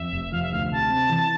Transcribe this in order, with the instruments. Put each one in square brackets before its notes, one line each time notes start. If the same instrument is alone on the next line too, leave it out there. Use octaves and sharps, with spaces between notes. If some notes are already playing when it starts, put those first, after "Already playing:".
Already playing: [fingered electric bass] F2 [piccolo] E5
[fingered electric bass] F1
[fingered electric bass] F3 [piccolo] F5
[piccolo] E5
[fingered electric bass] D2 [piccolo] F5
[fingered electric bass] C3 [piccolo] A5
[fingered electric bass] C4
E3